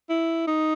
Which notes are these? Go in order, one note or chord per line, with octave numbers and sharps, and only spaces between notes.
E4
D#4